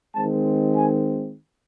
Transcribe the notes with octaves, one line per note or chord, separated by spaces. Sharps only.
D#3 G#3 C4 A5
G#5